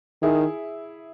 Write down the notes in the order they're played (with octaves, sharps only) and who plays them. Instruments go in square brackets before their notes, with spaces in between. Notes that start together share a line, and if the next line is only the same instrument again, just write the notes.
[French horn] D#3 [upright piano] E4 G#4